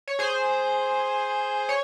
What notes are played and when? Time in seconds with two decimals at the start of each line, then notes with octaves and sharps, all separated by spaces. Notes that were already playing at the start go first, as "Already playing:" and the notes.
0.08 C#5
0.19 G#4 C5
1.69 C#5